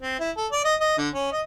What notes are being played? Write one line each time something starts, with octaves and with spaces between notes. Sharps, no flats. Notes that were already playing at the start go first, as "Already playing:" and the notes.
C4
E4
A4
D5
D#5
D#5
D3
C#4
D#5